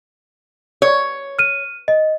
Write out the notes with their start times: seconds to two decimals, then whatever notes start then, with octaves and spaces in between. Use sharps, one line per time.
0.82 C#5
1.39 F6 D#7
1.88 D#5